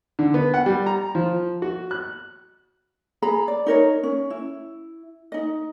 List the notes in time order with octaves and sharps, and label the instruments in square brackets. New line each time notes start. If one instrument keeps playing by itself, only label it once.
[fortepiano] D3
B3
F#5
G3
A#5
F3
F#4
F#6
[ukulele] G#4 A#5 B5
D5
D#4 A#4 C#5
C#4
E4
D#4 D#5